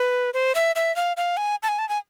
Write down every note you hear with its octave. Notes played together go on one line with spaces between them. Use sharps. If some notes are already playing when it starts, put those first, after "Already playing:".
Already playing: B4
C5
E5
E5
F5
F5
G#5
A5
G#5
A5
G#5